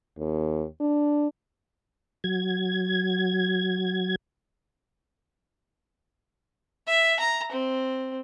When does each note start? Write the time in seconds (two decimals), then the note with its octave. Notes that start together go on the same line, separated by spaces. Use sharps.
0.18 D#2
0.81 D4
2.24 F#3 G#6
6.87 E5
7.20 A#5
7.52 C4